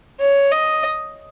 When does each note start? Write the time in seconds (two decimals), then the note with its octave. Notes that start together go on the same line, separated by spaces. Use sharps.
0.20 C#5
0.51 D#5